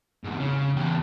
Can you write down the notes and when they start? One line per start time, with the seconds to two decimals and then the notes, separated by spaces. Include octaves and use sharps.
0.24 E2 G#2
0.40 C#3
0.76 E2 G4